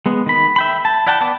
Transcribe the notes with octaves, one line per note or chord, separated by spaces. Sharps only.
G#3 B3
D#3 B5
E5 G5 B5
A5
E4 D5 F#5 G5 A5
B3 D5 A5 D6